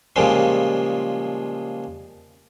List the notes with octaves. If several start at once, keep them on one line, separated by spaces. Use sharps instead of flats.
A#2 C#3 F3 G3 G#3